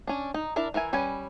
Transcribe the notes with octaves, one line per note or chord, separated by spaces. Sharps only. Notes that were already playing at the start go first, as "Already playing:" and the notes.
C#4 D4
D#4
D4 E4 A#4 D5
E3 A#4 E5 G#5
G3 C#4 B4 G#5